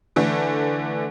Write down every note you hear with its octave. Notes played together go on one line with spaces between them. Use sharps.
D3 E3 A3